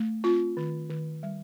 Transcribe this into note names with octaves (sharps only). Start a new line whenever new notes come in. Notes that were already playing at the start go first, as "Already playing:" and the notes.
Already playing: A3
C4 F4
D#3
D#3
G3